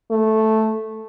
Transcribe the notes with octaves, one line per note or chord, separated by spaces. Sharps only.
A3